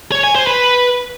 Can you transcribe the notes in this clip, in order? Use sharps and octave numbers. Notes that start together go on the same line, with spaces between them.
C#5
G#5
C5
B4